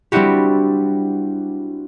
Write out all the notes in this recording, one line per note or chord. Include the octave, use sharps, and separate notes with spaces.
G3 C4 D4 E4 F#4 G4